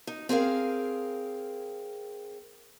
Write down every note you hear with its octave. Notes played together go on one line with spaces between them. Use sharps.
D#4
C4 G#4 A#4 F5